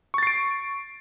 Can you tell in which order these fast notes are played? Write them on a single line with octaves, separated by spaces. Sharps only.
C#6 A6 C7 D7